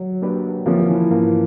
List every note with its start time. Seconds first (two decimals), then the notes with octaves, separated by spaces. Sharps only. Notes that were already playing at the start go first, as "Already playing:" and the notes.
Already playing: F#3
0.22 A#3 D4 G4 B4
0.66 F3 A#3 C#4 E4
0.89 E3
1.11 G#2 F3 A#3